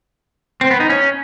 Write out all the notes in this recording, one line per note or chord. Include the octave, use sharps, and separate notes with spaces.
C4
B3
D#4
C#4